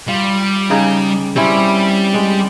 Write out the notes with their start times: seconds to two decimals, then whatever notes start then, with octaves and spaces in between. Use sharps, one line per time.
0.08 G3 F4
0.70 C#3 D#4 G#4
1.36 G3 C4 C#4 E4
2.14 G#3